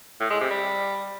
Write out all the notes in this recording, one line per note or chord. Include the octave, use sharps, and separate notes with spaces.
A2
G#3
C3
G3